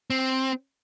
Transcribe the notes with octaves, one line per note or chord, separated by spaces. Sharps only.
C4